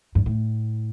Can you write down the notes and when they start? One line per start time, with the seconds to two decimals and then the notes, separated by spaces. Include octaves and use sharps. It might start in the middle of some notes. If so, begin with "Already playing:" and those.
0.15 G2
0.26 A2